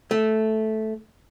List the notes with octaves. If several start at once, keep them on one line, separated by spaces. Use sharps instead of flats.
A3